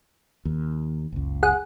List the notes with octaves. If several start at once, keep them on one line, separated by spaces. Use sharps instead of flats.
D#2
F#1 C#2
G#4 F#5